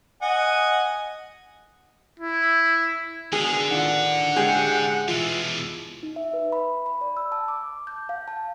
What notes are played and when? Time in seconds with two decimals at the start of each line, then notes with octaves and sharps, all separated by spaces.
0.22 D#5 F#5 G#5
2.19 E4
3.33 B2 D3 D#3 G#3 G#4
3.70 A2 D#3 D4 F4 F#5
4.36 G#3 C#4 G4 G#4
5.08 B2 E3 E4 F4
6.03 D#4
6.16 E5
6.33 B4
6.52 B5
6.86 B5
7.01 D5
7.17 E6
7.32 A5
7.48 D6
7.87 G6
8.09 F5
8.28 A5